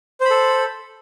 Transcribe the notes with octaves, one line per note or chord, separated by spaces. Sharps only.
A4 C5 B5